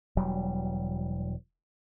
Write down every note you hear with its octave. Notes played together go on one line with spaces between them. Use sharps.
E1 F#3 G3